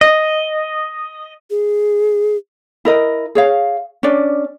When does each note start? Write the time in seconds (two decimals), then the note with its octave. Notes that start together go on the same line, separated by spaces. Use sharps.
0.01 D#5
1.50 G#4
2.85 E4 A#4 D#5
3.35 G#4 C#5 F5
4.03 C#4 D4 D5